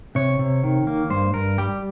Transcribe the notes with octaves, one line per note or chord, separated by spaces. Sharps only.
C3 C#5
C3
D#3
A#3
G2 C5
G2 A#4
G3 G4